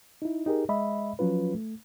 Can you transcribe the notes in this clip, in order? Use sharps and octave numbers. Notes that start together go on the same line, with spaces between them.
D#4 E4
D#4 G4 G#4 A#4
G#3 D#5 E5 B5
F3 F#3 C#4 F4 B4
A3